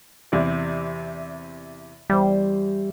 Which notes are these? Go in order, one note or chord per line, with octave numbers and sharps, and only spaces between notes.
E2 C3 D5
E2 G3 C5